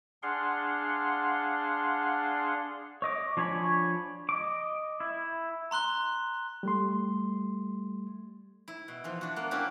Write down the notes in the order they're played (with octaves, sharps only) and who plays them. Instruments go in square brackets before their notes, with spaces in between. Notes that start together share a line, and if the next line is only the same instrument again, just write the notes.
[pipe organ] D4 G#4 F5 F#5 C6
[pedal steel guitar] C#5 D#5 D6
F3 D4 C#5 G#5 B5
D#5 D6
E4
[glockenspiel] A#5 C6 F#6 G7
[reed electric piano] G3 A3 C6
[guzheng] E4
B2
E3 F3
D4 F#4
A#3 B3
A#3 C#4 D4 E4 G4